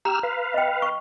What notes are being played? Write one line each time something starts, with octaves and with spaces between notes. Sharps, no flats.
G4 A#5 E6 F6
B4 F5
D#5 G5
C#6